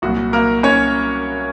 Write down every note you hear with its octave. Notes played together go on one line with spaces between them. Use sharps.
C2 A#2 F#3 F#4
A#3 A#4
C#4 C#5